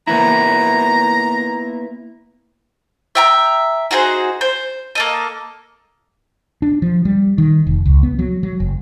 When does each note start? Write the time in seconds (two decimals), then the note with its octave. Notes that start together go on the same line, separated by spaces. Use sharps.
0.07 A#3 B3 E4 A#5
3.15 E5 G5 A#5
3.91 D#4 F#4 G#4 C5
4.41 C5
4.95 A#3 A4 D#5
6.62 D4
6.82 F3
7.05 G3
7.38 D#3
7.67 F1
7.86 C#2
8.03 B3
8.19 F#3
8.43 F#3
8.60 F#1